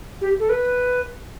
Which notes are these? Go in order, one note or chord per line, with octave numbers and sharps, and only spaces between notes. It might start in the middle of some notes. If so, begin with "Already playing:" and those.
G4
A4
B4